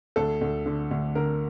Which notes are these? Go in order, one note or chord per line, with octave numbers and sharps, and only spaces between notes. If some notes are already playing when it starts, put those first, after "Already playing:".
D2 A4
D2
D3
D2
D3 A#4